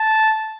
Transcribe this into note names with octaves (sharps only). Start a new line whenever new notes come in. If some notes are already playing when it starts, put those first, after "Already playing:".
Already playing: A5